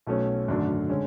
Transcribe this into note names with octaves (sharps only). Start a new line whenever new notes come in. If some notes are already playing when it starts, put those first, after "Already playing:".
B1 B2 A3 C#4
G#1 F#2 D3 A3 D4
D3 G#3 C#4